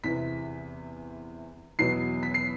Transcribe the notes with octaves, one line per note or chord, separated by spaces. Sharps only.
E2 C3 E3 B6
E2 B2 F#3 C7
B6
C7